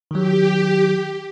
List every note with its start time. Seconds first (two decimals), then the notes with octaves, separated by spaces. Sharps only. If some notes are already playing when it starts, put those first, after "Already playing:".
0.11 D#3 F#3 G4